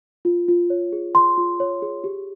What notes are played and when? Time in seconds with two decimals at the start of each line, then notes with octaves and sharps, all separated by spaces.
0.25 F4
0.48 F4
0.70 C#5
0.93 G#4
1.15 F4 C6
1.38 F4
1.60 C#5
1.82 G#4
2.04 G4